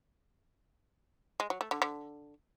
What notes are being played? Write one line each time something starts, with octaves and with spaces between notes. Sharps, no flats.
G#3
F#3
A3
D3
D3